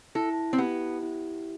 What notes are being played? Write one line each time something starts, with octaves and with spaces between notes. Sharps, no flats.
E4 A4
C4
B3 G4
E4